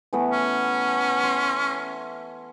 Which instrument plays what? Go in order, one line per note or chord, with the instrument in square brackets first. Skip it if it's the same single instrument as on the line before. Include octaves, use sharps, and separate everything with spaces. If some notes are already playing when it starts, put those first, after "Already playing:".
[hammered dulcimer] E3 A3 B3
[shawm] C#4
[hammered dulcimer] C6